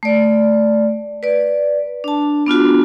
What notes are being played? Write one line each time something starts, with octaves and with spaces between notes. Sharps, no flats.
A3 D5
B4 D5
D4 A5
B3 D4 F4 F#4